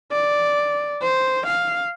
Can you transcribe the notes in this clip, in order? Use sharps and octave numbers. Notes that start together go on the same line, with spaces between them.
D5
C5
F5